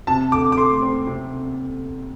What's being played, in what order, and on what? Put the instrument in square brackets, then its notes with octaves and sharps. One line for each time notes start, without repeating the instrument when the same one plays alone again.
[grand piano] C3 [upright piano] A5
[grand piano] D2 [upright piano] D6
[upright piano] D6
[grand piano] A3 [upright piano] C6
[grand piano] C4
C3